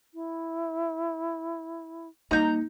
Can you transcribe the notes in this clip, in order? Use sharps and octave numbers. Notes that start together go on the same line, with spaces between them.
E4
G3 A#3 D#4 A#5 G6